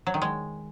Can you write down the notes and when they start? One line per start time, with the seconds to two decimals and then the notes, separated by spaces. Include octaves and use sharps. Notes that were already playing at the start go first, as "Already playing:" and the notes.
0.07 F#3
0.14 D#3
0.22 G#3